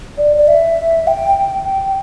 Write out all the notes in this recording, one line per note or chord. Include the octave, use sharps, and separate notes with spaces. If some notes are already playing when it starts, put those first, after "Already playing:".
D5
D5
E5
G5